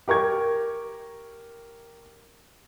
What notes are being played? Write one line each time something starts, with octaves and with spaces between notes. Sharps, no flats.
G4 A#4 C#6 G#6